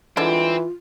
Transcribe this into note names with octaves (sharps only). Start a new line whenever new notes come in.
D3 E3 G3 G#3 C4 F4